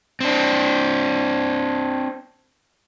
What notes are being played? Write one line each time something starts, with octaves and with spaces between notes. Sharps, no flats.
C4 D4